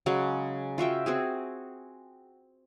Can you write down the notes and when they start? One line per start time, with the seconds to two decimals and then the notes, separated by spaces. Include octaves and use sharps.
0.06 C#3 F#3 G#3
0.78 F4 F#4 E5 G5
1.06 C4 F#4 G#4